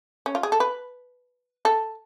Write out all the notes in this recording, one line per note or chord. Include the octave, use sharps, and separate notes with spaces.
C#4
F4
G#4
A4
B4
A4